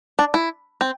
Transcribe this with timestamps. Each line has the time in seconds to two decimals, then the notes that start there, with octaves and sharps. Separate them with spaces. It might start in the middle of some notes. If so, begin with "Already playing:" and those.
0.19 D4
0.34 E4
0.81 C4